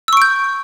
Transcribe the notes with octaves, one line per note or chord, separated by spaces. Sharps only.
C#6 E6 G6 D7